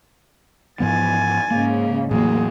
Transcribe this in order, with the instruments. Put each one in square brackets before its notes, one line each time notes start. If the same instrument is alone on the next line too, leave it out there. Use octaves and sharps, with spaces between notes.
[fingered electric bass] G#2 F3 B3 [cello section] E3 [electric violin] G#5 A6
[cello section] G#2 C#3 [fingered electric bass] A#3
[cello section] E2 G3 A#3 [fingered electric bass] A2 E3 F#3 [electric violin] G#4